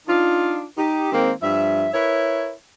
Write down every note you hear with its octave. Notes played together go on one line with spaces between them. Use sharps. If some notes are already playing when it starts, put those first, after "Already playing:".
D4 D#4 F4
D#4 G4
D#3 G#3 A#3 C4
G2 F3 E5
E4 A#4 B4 C#5